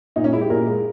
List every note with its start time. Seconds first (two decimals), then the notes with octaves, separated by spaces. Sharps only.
0.16 A#2 D#4
0.24 C#4
0.33 G#3 E4
0.41 G4
0.50 A#2 A#4
0.67 G#3